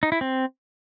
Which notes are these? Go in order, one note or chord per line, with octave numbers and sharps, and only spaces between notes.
D#4
E4
C4